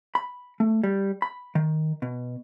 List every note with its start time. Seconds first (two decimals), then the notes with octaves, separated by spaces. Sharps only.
0.15 B5
0.60 A3
0.84 G3
1.22 B5
1.55 D#3
2.02 B2